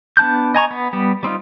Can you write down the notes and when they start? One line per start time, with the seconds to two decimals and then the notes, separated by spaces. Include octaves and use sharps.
0.17 B3 D4 A5 F#6 G6
0.55 D#5 G#5 A#5 C#6
0.71 B3
0.93 G3 B3
1.23 G3 C4 D#4 F4